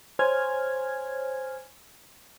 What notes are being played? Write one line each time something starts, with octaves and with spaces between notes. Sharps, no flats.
C5 C#5 G#5 F6 G#6